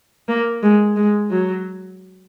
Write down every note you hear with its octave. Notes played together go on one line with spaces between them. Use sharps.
A#3
G#3
G#3
F#3